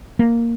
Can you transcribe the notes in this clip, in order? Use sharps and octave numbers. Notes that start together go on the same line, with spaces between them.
A#3